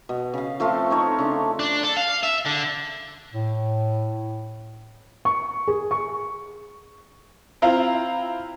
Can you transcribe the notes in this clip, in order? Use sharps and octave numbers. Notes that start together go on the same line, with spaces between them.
B2
C#3 F5
F3 A3 C4 F4
C4 D#4 C#5
C#3 D4
D4
A4
F5
E5
D3
A2
C#6
G#4
C#6
C4 E4 F4 F5 A#5